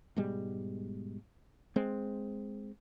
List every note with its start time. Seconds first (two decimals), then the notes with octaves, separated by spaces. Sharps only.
0.17 G#2 B2 G3 G#3
1.76 G#3 C4